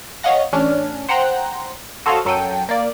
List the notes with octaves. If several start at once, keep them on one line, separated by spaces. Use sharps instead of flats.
C#5 D#5 F5 F#5 A#6
A1 C#4 D4 F6
C5 F#5 G5 A#5 C6 F#6
F#4 A4 C5 C#5 D#5 F5
F#2 F#3 A4 G5 D#7
A#3 D5